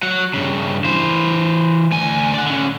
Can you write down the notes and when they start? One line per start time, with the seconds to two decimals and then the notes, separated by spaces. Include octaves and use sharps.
0.03 F#3 F#5
0.34 G2 C#3
0.85 E3 C5
1.92 D2 G#5
2.34 D5 F#5
2.47 D3 C#4